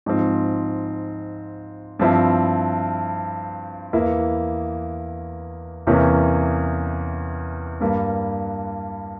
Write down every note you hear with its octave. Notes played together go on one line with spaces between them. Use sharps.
G#2 F3 C4
G2 F3 C4 E4
E2 E3 A#3 E4
E2 C3 E3 A#3 C#4
G2 G3 A#3